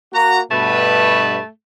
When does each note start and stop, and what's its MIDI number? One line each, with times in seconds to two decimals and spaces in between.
0.13 0.41 58
0.13 0.41 66
0.13 0.41 82
0.51 1.38 43
0.51 1.38 47
0.51 1.49 57
0.51 1.38 71